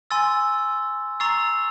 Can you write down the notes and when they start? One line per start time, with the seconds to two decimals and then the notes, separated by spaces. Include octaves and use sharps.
0.11 G#5 C6 E6 A6
1.20 A#5 C#6 E6 A6 C7